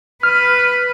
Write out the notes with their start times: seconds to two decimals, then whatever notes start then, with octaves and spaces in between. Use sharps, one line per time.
0.23 B4 F6